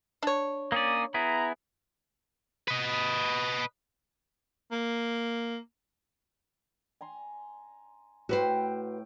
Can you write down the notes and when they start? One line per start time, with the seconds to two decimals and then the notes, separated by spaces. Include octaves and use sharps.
0.23 D4 C#5
0.72 A#3 C#4 D5 D#6
1.14 B3 E4 G#4 A#5
2.68 B4 D#5
4.72 A#3
7.01 G#5 A#5 C6
8.29 A2 F#4 B4 C5 G5